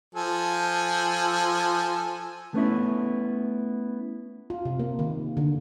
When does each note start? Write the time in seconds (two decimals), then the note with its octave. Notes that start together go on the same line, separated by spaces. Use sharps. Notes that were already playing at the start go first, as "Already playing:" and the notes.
0.15 F3 A4 G#5
2.54 A3 B3 C#4 E4
4.50 F4
4.65 C3
4.80 A#3
4.99 D#3
5.37 D3